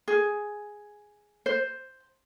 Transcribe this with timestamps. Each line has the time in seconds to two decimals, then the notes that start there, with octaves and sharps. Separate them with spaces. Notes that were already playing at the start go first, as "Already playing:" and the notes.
0.08 G#4
1.46 C5